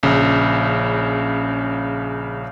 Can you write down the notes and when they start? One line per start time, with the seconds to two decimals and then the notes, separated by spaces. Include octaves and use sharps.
0.03 A#1 C#3